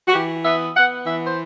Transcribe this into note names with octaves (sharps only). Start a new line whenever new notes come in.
F#4
E3 G4
B3 E5
B3 F#5
E3 E5
C5